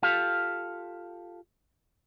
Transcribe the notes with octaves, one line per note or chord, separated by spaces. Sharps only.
F4 G4 A4 F5